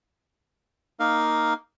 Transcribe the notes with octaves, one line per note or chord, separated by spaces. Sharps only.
A#3 D#4 A#4 F5